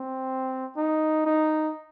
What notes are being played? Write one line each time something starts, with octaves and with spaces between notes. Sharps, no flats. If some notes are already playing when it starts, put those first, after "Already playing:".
Already playing: C4
D#4
D#4